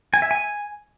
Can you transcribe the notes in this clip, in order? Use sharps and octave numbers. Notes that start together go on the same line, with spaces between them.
G#5
E5
G#5